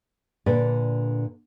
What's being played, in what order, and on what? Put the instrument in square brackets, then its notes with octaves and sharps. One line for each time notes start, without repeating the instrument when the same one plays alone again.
[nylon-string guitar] A#2 D3 B4 D5